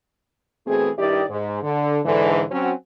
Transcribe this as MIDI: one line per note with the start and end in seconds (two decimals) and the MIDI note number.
0.67 0.90 47
0.67 0.90 52
0.67 0.90 57
0.67 0.90 60
0.67 0.90 68
0.98 1.24 43
0.98 1.24 51
0.98 1.24 64
0.98 1.24 67
0.98 1.24 74
0.98 1.24 75
1.30 1.63 44
1.63 1.99 50
2.05 2.43 44
2.05 2.43 50
2.05 2.43 52
2.51 2.72 54
2.51 2.72 60
2.51 2.72 61
2.51 2.72 66